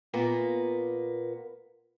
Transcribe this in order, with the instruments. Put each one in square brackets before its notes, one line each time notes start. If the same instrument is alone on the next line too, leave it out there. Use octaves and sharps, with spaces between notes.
[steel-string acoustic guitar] A#2 A#3 B3